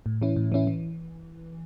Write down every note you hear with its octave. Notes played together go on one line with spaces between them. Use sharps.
A2
E3 C#4 E4
A2
E3 C#4 E4
E3